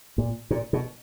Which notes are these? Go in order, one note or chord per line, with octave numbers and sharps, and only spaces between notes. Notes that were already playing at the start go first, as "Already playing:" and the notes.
A#2
A#2
B2